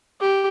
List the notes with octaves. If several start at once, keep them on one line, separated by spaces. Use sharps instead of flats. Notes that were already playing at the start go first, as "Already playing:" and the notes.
G4